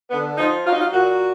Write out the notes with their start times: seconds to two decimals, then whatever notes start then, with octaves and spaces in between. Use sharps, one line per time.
0.10 D3 B3
0.38 F3 D#4
0.65 F#3 F4
0.73 D#4
0.80 F4
0.92 A#2 F#4